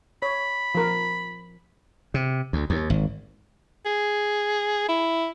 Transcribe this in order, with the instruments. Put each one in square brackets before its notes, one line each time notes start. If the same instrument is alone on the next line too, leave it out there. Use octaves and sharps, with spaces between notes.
[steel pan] C#5 [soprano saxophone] B5
[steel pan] F3 A#4
[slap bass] C3
D2
D#2
G#1
[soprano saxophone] G#4
E4